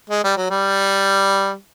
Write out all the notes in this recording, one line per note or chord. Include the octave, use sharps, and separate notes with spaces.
G#3
G3
F#3
G3